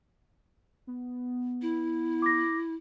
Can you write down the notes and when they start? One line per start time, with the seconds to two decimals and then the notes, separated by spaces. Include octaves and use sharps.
0.87 B3
1.62 E4
2.22 D6 A#6